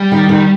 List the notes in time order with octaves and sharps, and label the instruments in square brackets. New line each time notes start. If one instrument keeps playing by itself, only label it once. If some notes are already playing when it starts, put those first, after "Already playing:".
Already playing: [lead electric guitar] G3
[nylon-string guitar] D#3
D#3